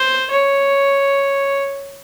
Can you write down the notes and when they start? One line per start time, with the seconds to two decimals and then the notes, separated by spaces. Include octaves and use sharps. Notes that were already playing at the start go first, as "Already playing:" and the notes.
Already playing: C5
0.30 C#5